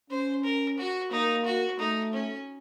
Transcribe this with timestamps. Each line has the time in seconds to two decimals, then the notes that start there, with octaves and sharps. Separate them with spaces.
0.10 C#4 C5
0.44 A#4
0.78 F#4
1.11 A#3 D#4
1.45 F#4
1.79 A3 D#4
2.13 C#4